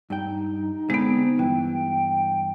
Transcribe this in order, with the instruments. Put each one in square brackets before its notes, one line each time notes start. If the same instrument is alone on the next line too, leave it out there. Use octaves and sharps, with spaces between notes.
[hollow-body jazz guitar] G2 G5 [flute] D#4
[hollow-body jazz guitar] D3 C4 G#4 [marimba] G#3 B3
[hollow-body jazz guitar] G2 E3 [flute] G5